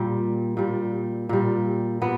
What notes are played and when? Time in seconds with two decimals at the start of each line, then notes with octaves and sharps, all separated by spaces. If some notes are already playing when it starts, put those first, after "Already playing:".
Already playing: A#2 G3
0.57 A#2 G3
1.29 A#2 G3
2.02 A#2 B3